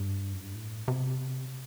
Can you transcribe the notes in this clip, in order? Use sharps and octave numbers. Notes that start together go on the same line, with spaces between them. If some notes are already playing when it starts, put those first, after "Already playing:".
Already playing: G2
F#2
G2
A2
C3